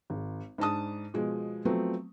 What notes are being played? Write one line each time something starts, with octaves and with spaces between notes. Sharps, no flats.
G#1
G#2 D4 A5 D#6
B2 F3 G#3
F3 F#3 A3 B3 C4